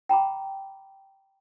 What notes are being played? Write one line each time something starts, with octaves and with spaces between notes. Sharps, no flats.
G5 A#5 B5 D6